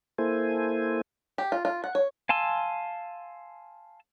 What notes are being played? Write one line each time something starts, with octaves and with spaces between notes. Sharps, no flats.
A#3 E4 A4 C5 G#5
G4
F4
F4
F#5
C#5
F5 G#5 A5 C6 E6